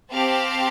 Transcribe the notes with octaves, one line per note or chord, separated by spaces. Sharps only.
C4 G4 F5 A5